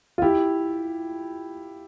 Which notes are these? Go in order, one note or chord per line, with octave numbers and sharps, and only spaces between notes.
F4
E4 G4